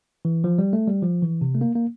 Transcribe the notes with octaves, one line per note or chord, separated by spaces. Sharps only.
E3
F3
G3
A3
G3
F3
E3
C3
A3
A#3
A#3